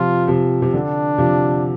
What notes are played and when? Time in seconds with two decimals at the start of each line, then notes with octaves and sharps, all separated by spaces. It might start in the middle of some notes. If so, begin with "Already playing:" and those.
Already playing: C3 F3 F4
0.28 C3 F3
0.62 C3
0.74 D3 D4
1.18 C3 F3